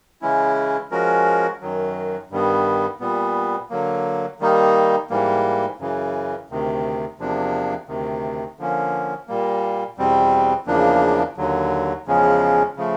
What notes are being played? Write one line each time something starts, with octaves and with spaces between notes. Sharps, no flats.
C#3 E3 G#3 C#4 E4
F3 G#3 C#4 F#4 A#4
F#2 D#3 F#3
G2 D#3 G3 B3
A#2 G3 B3
D3 F#3 A#3
D#3 G3 A#3 D#4
G#2 E3 G3 A#3
F#2 C#3 E3
D2 C3 D#3
E2 C3 F3 A#3 D4
D2 C3 D#3
D3 F3 A#3 C#4
A#2 G3 A#3
E2 B2 G3 C4
E2 C#3 F3 A#3 D4
D#2 D3 F#3
E2 C#3 F3 G#3 C#4
C#3 F3 A3